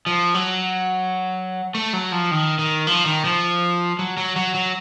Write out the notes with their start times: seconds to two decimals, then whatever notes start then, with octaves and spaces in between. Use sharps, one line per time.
0.06 F3
0.34 F#3
1.75 A3
1.93 F#3
2.12 F3
2.31 D#3
2.59 D#3
2.87 F3
3.06 D#3
3.25 F3
3.99 F#3
4.17 F#3
4.36 F#3
4.55 F#3